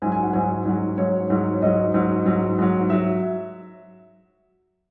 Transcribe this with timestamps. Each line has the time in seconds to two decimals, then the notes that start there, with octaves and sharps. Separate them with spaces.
0.02 G#2 G#5
0.05 F#3
0.12 G#5
0.23 F#5
0.33 G#2 F#3 G#5
0.65 G#2 F#3
0.98 G#2 F#3 C#5
1.30 G#2 F#3
1.54 C#5
1.62 G#2 F#3 D#5
1.94 G#2 F#3
2.26 G#2 F#3
2.59 G#2 F#3
2.90 F#3 E5